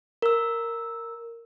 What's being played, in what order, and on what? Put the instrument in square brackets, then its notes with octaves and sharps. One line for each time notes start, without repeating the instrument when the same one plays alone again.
[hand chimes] A#4 E6